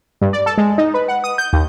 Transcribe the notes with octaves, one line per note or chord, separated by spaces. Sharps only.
G2
D5
A4
G#3
D#4
B4
F#5
D#6
G6
D#2